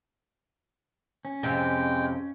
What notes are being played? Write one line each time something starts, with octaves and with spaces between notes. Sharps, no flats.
C#4
F2 C3 G#3 G5